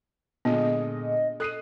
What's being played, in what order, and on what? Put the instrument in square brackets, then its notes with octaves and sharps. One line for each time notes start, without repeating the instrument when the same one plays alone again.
[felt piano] A#2 D3 G#3 [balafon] B3 [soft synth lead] D#5
[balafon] A4 [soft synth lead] D#6 [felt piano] F#6 C7 D#7